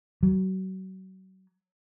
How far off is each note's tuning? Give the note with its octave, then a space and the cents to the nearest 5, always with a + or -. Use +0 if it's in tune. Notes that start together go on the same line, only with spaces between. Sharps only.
F#3 +30